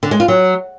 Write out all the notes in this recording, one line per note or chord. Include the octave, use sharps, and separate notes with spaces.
D3
G#3
F4
F#3